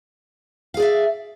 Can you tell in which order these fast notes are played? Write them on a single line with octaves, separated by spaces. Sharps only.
F5 G#4 D5 E5